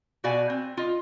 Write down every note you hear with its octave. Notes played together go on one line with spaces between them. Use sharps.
B2 F#4 D5 F5 G#5
C4
F4 D#5